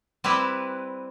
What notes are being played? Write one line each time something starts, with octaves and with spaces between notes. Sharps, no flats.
G3 C4 E4 G4 B4